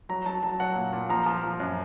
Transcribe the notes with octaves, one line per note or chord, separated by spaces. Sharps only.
F#3 A#5
F#3 A5
F#3 A5
F#3 F#5
A#2
A#2
F3 A#5
F3
F3
F#2